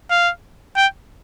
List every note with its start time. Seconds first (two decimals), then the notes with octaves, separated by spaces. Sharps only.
0.10 F5
0.77 G5